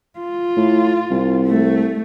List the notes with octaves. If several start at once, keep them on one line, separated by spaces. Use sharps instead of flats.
F4
A2
C2
A3